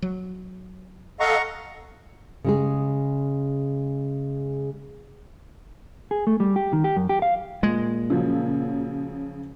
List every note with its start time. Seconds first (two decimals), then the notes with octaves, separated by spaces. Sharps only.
0.02 F#3
1.20 A4 D#5 F5 F#5 A#5 C#6
2.45 C#3 G#3 G#4
6.11 G#4
6.27 A3
6.40 G3
6.56 G4
6.73 D#3
6.84 G4
6.96 F#2
7.09 G4
7.22 F5
7.63 A#2 G#3
8.10 C#3 F3 F#3